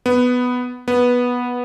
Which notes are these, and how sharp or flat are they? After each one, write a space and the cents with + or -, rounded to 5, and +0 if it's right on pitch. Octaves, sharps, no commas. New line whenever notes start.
B3 +5
B3 -10